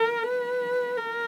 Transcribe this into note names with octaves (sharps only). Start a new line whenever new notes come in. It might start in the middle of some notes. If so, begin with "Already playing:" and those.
Already playing: A#4
B4
A#4